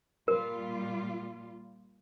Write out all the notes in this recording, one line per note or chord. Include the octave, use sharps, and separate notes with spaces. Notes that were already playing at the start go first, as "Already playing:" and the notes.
A#2 G3 F4 A#4